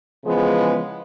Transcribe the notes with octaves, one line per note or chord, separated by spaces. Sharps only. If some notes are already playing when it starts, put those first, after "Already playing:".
C#3 E3 F3 G#3 B3 G#4